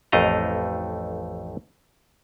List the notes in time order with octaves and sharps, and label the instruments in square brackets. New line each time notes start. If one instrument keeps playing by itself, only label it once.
[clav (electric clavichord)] A1 F2 A3 D#5 F5 A#5